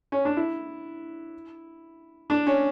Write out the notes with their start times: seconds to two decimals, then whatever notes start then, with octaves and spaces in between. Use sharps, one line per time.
0.12 C#4
0.25 D4
0.37 E4
2.30 D4
2.47 C#4